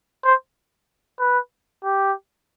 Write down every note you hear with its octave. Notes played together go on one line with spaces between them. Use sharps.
C5
B4
G4